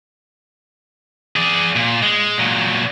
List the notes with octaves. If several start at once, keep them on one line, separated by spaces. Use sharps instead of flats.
G#4 D5
A#2
G#3
A#2 F#3